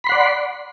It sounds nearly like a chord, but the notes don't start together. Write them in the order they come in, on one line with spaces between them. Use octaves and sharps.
B5 C6 F#5 D5